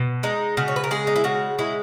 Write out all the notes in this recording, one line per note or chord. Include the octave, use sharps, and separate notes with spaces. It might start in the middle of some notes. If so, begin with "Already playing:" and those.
Already playing: B2
G#3 D#4
C#3 F#4
C#5
B4
A#4
G#3 G#4
D#4
E4
C#3 F#4
G#3 E4